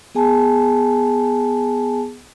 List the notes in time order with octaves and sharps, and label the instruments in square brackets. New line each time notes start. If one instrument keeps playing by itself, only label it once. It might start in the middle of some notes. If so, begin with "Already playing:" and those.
[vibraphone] B3 G#4 G#5 A5